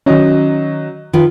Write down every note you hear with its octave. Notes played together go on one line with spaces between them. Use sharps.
D#3 F#3 C#4 D#4
D#3 F4 B4